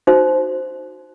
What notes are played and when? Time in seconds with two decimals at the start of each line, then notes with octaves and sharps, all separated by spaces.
0.07 D#4 F#4 C5